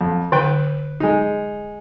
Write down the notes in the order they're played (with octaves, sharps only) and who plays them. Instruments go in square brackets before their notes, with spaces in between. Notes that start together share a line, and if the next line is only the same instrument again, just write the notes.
[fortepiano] F2
[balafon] D3 [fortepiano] B4 G5
[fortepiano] G#3 D#4